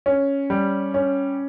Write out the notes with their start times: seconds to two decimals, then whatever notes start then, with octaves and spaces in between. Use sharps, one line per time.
0.06 C#4
0.50 G3
0.94 C#4